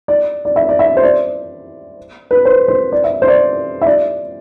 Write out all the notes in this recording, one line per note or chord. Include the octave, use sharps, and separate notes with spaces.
D5
D5
E5
D5
E5
C5
D5
B4
C5
C5
D5
E5
C5
D5
E5
D5